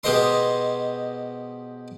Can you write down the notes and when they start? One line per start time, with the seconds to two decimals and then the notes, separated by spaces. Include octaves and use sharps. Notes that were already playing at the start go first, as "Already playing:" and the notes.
0.04 B2 G#3 G4 C5 D#5 C6